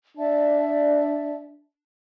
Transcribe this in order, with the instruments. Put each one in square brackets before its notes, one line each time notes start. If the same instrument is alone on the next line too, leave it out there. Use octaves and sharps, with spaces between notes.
[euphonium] D4 [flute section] D5 E5 A5